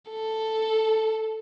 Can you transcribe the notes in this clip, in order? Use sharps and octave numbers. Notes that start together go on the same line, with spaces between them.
A4